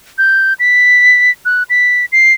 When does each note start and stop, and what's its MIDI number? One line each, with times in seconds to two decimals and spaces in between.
0.18 0.54 91
0.60 1.31 95
1.45 1.63 90
1.70 2.06 95
2.12 2.33 96